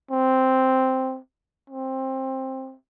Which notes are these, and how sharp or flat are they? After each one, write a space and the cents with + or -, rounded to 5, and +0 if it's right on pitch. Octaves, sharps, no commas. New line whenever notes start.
C4 +0
C4 +15